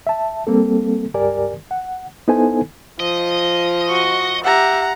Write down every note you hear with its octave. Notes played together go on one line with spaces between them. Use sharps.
E5 A5
G3 A#3 C4 A4
C#2 G2 G4 A#4 D5 G#5
F#5
B3 D#4 E4 A4 C5 G#5
F3 D#5
F#4 C#6
G4 E5 F#5 A#5